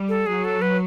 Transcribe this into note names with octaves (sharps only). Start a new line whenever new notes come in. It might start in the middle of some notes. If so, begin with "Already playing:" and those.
Already playing: G3
A4
F#3 G#4
A4
B4